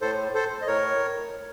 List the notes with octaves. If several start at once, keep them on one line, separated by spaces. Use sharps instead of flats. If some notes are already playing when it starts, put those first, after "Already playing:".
A2 A4 C5
A4 C5
D#5
A2 A#4 C#5